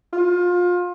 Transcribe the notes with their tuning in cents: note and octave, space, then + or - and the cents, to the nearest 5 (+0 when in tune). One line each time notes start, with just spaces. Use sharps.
F4 +25